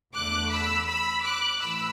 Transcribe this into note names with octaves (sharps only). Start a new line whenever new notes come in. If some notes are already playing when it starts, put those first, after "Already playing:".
E2 D3 A3 D6 F#6
B5 E6
B5 E6
D6 F#6
A2 E3 B5 E6